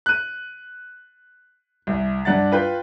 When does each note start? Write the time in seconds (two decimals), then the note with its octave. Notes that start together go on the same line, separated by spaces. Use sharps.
0.06 F#6 D#7
1.87 C2
2.25 G2 D4 F#5 A6
2.52 F4 B4 G5 G6